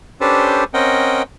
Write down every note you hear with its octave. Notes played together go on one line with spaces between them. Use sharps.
C#4 D4 G4 A4 B4 C5
C4 C#4 A#4 D#5 F#5 G5